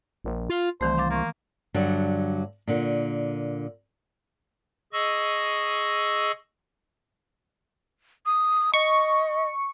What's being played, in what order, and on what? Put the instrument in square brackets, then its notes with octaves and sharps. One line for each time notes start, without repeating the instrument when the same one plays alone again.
[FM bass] A#1
F4
[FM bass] C2 [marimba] D#3 E3 A3 [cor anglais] C5
[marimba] F5 D6 A6
[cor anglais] A#3 [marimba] C6 C#6
[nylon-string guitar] G2 D3 F#3
A#2 D3
[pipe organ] G#4 D#5 C#6 E6
[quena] D#6
[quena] D#5 [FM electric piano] C#6